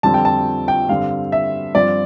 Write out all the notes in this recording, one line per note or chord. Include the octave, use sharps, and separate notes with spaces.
F2 D3 G3 C4 A5
G5
A5
G5
G2 D3 G3 C4 F5
E5
G2 F3 C4 D5